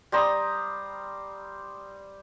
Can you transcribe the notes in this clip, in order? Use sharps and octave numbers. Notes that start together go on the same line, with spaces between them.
G3 C5 A#5 D#6